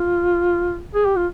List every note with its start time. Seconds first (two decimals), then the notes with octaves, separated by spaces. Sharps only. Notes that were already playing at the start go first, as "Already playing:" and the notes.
Already playing: F4
0.95 G#4
1.05 G4
1.16 F4